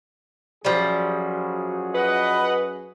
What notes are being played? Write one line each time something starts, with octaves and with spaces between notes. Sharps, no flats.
F#2 F3 G3 F#4 G#4
B4 D#5 F#5